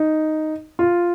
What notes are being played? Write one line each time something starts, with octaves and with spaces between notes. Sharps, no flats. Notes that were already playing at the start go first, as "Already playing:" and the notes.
Already playing: D#4
F4